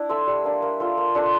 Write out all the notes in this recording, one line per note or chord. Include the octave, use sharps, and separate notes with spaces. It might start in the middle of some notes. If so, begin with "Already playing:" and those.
Already playing: D4 E4
A4 C5 E5
G3
A#3 D4
A#3
F4 A4 C5
A#3
D4 A4 C5